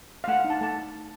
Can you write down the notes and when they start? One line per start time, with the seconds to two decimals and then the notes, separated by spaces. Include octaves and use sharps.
0.24 F5
0.28 A3 F#5
0.45 D#4
0.50 A5
0.61 A3 A5